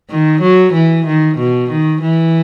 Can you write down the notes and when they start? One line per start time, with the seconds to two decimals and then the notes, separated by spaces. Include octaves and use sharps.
0.10 D#3
0.42 F#3
0.74 E3
1.07 D#3
1.38 B2
1.71 D#3
2.02 E3